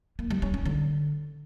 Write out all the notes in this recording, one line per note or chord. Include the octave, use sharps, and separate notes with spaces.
A#3
G3
C#4
C#4
D3